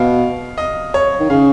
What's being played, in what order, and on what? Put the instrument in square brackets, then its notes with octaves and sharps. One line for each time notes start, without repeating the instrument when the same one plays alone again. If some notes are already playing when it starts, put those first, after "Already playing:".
Already playing: [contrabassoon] B2 [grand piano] F5
[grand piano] D#5
C#5
[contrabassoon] D#3
[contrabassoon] C#3 [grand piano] F5